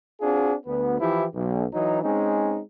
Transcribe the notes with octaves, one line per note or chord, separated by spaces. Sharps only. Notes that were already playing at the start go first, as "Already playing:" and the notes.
C4 D4 F4 F#4 G#4
D2 B3
E3 F3 E4 G4
B1
E3 F#3 D#4
G#3 C4 C#4 D#4